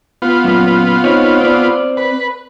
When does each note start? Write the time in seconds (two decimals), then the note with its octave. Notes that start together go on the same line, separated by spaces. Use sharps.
0.22 B3 F4
0.44 F#2 A#2
1.04 C4 D#4 C#5
1.41 C4 D5
1.97 B4